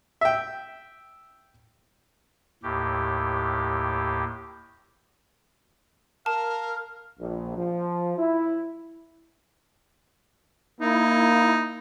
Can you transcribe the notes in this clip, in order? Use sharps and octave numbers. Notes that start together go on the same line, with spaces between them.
E5 G5
D#2 A2 G4
A#4 F5 A5
A#1
F3
E4
A#3 D#4 E4